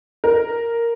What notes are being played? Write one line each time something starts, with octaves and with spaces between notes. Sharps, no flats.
A#4